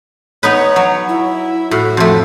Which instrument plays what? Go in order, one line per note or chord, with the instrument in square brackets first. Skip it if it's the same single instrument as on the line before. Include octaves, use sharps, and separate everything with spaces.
[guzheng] B3 D#4 B4 [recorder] C#5
[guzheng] F#3
[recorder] E4
[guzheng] A2 [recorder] F#4
[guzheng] F2 A3